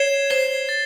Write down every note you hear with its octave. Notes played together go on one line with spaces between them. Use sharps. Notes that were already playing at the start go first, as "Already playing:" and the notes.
Already playing: C#5 G#6 C7 E7 G7
C5 G#6 C7 E7 G7
A6